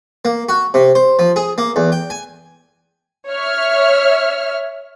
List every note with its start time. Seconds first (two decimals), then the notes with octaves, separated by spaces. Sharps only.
0.25 A#3
0.49 F#4
0.74 C3
0.95 C5
1.19 F3
1.36 G#4
1.58 A#3
1.76 E2
1.92 G5
2.10 G#5
3.30 C#5 E5 F6